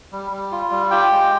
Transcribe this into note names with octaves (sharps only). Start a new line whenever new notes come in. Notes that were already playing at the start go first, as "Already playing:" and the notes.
G3
G3
F4
G3
F4 G4 G5
G#3